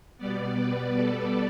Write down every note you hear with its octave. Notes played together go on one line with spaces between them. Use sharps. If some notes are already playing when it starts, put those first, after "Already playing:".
B2 G3 B3 D5
B4
A4